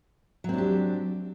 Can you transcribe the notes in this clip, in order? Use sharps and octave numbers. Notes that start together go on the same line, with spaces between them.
F#3 C4 D4 G4